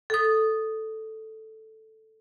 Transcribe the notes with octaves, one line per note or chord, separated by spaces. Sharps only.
A4 D#6